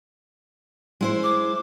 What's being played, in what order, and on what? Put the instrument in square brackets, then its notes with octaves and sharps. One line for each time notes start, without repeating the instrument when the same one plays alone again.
[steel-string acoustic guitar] G#3 E4 C5
[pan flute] D6